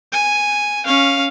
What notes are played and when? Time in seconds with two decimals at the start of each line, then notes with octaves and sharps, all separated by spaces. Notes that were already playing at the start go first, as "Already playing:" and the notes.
0.13 G#5
0.85 C#4 F5